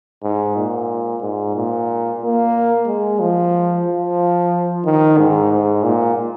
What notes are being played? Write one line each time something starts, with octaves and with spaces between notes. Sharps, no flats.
G#2
A#2
G#2
A#2
A#3
G#3
F3
F3
D#3
G#2
G#2
A#2